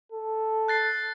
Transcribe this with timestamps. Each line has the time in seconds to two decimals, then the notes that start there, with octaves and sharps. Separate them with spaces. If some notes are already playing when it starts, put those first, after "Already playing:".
0.12 A4
0.68 F#6 A6 C7